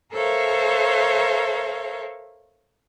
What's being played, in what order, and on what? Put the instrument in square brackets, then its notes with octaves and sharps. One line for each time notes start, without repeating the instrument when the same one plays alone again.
[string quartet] A4 A#4 C5 C#5 E5 F5